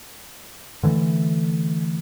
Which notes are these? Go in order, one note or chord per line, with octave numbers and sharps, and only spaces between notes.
D3 E3 G3 A3